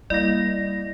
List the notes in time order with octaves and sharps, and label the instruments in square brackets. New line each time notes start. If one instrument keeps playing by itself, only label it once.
[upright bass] G3 [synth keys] A#3 E4 D#5 [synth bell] D5 A#6